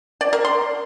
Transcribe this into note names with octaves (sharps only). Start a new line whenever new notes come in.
D5
A#4
C6